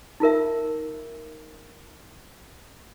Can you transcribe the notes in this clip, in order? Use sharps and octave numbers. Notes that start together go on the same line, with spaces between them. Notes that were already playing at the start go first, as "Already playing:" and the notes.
D#4 F4 A#4 E5